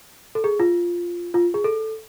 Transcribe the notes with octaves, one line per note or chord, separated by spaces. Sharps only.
A4
G#4
F4
F4
G#4
A4